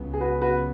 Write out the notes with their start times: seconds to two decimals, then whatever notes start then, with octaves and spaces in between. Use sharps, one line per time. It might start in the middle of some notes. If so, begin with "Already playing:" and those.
Already playing: C#2 C#3 F#3 B3
0.14 G#4
0.21 F#4 B4
0.42 F#4 B4